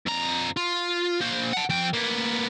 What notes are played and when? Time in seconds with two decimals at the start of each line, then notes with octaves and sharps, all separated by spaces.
0.06 F2 A#5
0.57 F4
1.21 A#3 C5
1.53 F#5 A5
1.70 F3 G5
1.93 A#3 B3